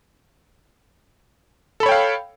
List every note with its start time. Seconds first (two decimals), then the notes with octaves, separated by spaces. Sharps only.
1.80 A4
1.83 B5
1.86 C#5
1.89 G5
1.92 F5